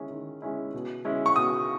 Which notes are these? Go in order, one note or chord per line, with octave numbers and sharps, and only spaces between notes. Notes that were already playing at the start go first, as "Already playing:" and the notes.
Already playing: D#3 G#3 C#4 E4
D#3
G#3 C#4 E4
B2
G#3 C#4 E4
C#6
B2 D#6